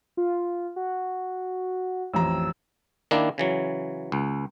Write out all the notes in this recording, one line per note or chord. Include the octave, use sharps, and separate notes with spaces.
F4
F#4
A1 F2 A#5 E6
D#3 A#3 D4 E4
C#3 E3 F#3
C#2